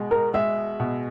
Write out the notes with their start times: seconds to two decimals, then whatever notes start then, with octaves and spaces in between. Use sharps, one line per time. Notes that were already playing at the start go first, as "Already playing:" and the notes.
Already playing: B2 G#3
0.11 A#4
0.34 G#3 E5
0.80 B2